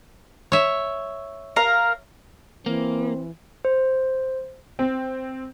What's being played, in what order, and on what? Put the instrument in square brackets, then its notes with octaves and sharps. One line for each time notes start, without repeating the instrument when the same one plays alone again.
[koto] C#5 E5
[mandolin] A#4 F5
[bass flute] E3 [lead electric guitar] A#3 [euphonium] C4
[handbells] C5
[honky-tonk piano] C4